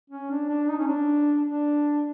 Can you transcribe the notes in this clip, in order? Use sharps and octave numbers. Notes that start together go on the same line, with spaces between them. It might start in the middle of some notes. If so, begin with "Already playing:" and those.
C#4
D4
D4
D#4
C#4
D4
D4